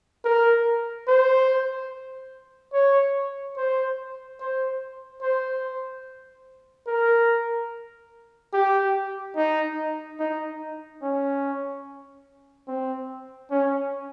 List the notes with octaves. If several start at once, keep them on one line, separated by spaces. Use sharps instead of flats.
A#4
C5
C#5
C5
C5
C5
A#4
G4
D#4
D#4
C#4
C4
C#4